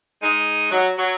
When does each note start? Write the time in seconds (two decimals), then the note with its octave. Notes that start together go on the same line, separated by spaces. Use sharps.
0.23 G#3 D#4
0.72 F#3
0.98 F#3